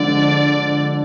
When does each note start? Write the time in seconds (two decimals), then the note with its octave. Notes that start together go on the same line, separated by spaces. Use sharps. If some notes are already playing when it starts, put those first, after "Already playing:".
Already playing: D3 F3 G#3 D5